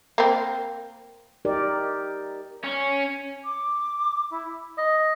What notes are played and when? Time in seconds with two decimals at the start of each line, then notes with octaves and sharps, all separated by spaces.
0.18 A#3 C4
1.45 D#4 G4 A#4 D5
2.64 C#4
3.44 D6
4.31 E4
4.78 D#5